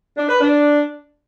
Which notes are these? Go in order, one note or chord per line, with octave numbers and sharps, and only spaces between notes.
D4
B4
D4